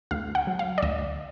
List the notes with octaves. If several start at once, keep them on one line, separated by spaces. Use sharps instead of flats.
D2 F5
F#5
F#3
F5
D5
D2 D#5